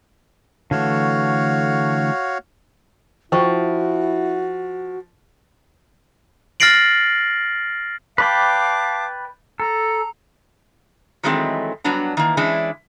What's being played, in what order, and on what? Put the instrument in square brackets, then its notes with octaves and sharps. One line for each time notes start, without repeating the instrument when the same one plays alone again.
[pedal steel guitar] D3 E3 A3 [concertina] F#4 C#5 F5
[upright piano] F3 [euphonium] E4 [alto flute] F#4 [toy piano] G5 C#6
[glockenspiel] F6 A6 A#6 C7 D7 F#7
[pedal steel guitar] B4 D5 G5 [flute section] F5 A5 D6
[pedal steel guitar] A4 [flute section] A#5
[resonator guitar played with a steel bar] D#3 E3 F#3 G#3 A3 C4
F#3 G3 B3 D4 A#5
D#3 E3 A#3
E3 G#3 C#4 D4 E4